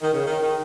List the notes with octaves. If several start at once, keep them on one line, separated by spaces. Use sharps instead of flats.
D#3
C#3
D#3
D#3